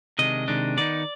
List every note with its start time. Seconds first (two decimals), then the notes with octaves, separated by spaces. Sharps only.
0.19 C3 D#3 G#3 D4 D#5
0.48 C3 D#3 G#3 D4
0.77 D#3 B3 D#4 D5